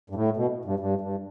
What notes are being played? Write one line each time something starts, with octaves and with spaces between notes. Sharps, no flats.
G2
A2
B2
G2
G2
G2